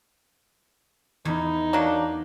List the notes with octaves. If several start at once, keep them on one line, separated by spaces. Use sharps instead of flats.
E2 D#4
F#3 A#3 D4